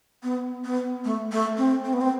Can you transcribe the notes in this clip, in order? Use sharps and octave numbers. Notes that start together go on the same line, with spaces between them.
B3
B3
A3
A3
C4
C4
B3
C4